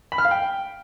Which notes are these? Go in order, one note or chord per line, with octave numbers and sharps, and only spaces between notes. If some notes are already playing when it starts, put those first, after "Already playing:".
B5
F6
F5
G5